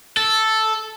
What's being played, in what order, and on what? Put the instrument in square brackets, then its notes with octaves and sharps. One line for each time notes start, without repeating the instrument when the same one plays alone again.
[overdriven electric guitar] A4